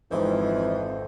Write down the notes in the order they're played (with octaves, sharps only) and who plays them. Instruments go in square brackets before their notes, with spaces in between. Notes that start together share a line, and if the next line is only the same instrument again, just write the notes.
[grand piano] G#1 D#4 C5 [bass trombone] F2 [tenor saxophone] E3